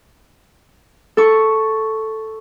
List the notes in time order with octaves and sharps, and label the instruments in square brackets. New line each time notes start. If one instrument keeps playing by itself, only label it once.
[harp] A4 C#6